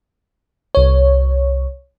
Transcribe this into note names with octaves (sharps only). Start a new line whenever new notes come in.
C2 C#5